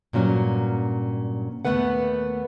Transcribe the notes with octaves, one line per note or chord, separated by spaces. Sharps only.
G2 A#2 F#3 C#4
D#2 F#3 A3 B3 B4 F#5